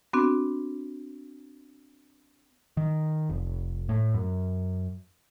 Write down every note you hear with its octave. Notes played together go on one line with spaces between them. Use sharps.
B3 C4 D4 F#4
D#3
F1
A2
F#2